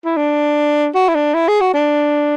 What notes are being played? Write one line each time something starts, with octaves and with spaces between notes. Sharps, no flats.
E4
D4
F#4
E4
D4
E4
G#4
F#4
D4